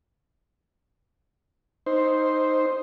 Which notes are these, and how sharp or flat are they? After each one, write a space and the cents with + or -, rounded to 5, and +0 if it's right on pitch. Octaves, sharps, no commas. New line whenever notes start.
D#4 +0 C5 +0